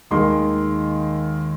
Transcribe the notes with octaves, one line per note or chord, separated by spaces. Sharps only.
D#2 D#3 G#3 C6